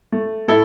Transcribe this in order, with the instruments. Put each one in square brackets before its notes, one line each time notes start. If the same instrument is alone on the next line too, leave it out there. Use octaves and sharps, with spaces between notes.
[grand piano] A3
A2 E4 A4